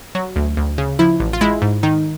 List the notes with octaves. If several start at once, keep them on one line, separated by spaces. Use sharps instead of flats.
F#3 F#4
D2
D2
C#3
F3 E4
A1
F4
G#3 E4
G#2
D#3 D#4